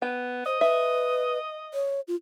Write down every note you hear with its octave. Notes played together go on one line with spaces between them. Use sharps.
B3 G5
C5 D#5
B4 E5
C#5
F4